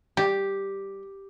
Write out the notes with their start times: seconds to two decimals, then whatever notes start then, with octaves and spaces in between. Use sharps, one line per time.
0.17 G3 G4